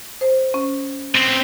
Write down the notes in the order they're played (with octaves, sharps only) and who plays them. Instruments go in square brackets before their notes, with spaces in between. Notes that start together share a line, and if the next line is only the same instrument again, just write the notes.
[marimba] C5
C#4
[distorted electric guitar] B3 C4